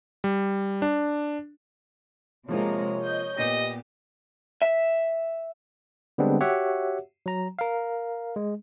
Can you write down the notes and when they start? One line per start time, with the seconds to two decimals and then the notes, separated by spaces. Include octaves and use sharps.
0.24 G3
0.82 D4
2.48 C3 F3 G#3 A#3 F4 C#5 A#5
3.02 D#5 G6
3.38 A#2 B3 G4 D#5
4.62 E5
6.18 D3 G3 G#3 B3 C4 D4
6.40 F#4 G4 C#5 E5 F#5
7.26 F#3 A#5
7.59 A#4 F5
8.36 G#3